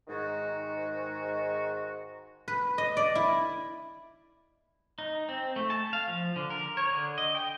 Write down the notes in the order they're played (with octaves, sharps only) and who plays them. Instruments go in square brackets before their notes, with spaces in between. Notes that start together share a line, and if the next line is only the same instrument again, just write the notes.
[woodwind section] G#2 D#3 F#4
[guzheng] B4
D#5
D5
E4
[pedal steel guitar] D#4
C4
A3
A5
F5
F3
D3
A#4
C#5
D3
D#5
G5